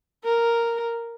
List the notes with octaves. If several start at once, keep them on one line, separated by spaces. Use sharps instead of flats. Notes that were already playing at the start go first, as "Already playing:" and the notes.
A#4